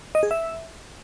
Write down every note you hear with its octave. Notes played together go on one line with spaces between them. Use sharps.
D#5
G#4
E5